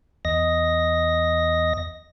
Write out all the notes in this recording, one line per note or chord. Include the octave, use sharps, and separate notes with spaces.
E2 D#5 A#6